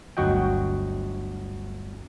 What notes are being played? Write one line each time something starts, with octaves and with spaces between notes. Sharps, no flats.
G1 D2 F#3 F#4 D#5 G5